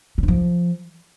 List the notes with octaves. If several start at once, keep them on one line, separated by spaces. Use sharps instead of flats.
C#3
D3
F3